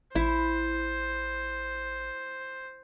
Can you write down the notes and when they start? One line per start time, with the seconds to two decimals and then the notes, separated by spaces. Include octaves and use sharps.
0.15 A1 E4 C5